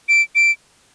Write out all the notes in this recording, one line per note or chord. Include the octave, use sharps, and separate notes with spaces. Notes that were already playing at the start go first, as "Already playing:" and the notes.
D7
D7